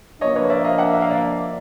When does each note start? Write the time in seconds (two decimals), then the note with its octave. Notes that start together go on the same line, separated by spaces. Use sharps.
0.21 F3 A#3 D4 C#5 D#5
0.35 B4 C#5
0.50 D5 E5
0.64 D#5 F5
0.78 E5 F#5
0.93 E5
1.02 F5
1.11 D5 E5